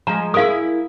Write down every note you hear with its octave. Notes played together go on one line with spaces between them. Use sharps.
F3 G#3 A#5
E4 G#4 A#4 F5 D#6